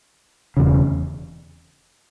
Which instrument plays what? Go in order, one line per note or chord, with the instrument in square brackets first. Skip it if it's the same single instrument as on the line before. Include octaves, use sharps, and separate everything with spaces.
[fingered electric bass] E1 E2 C#3